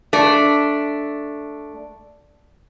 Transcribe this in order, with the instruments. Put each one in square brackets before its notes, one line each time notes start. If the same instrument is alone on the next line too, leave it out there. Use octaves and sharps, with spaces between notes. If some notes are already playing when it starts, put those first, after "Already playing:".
[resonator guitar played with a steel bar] A3 D4